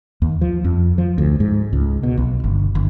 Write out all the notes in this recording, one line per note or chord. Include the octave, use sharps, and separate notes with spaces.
D#2
F3
F2
F3
D2
G#2
C#2
B2
B1
G1
G1